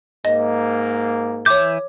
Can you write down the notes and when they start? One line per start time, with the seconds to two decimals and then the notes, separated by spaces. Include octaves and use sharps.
0.25 G#2 A#3 D#5
1.46 E3 C#5 E5 D6 G6